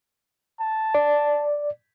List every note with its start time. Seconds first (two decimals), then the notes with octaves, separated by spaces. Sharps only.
0.60 A5
0.95 D5